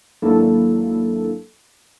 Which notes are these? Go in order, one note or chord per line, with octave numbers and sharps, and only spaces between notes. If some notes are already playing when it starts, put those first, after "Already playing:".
G#1 F#3 A#3 D4 E4 A4